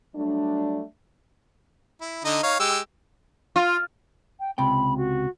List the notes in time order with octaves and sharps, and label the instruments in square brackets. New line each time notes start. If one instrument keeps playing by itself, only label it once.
[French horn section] F#3 G3 A3 D4
[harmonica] E4
D3 D#4 D#5
D#4 C#5 F5
G#3 G4 E6
[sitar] F4
[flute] G5
[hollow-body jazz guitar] C#2 C3 G5 [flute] B5
[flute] F#4